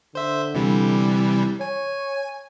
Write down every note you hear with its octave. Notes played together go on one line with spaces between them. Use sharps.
D3 C5 E5
C3 E3 G3
C#5 G#5